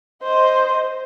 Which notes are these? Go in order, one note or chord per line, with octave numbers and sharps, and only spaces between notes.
C5 D#5